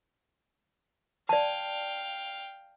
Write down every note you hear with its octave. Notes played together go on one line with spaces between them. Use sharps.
D5 F5 G5 A5